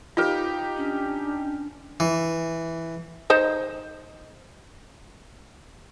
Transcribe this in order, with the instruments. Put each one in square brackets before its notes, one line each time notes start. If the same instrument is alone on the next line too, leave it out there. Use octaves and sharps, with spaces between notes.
[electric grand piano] D#4 G4 [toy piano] F4 B4 [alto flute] F5
[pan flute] C#4 [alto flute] D4
[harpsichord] E3
[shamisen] D#4 C5 D#5